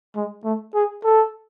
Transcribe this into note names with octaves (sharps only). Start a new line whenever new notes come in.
G#3
A3
G#4
A4